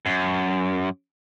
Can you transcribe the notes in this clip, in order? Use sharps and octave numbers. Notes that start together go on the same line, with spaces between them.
F#2